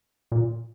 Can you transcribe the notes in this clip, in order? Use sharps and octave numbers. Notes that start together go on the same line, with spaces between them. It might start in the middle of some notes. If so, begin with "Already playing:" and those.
A#2